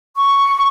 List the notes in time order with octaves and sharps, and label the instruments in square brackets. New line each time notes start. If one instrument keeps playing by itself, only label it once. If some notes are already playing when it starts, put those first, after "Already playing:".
[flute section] C#6